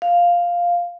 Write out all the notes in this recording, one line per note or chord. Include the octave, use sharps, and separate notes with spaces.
F5